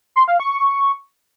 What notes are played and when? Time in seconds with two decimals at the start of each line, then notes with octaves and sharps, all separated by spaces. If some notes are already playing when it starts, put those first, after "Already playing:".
0.16 C6
0.28 F5
0.40 C#6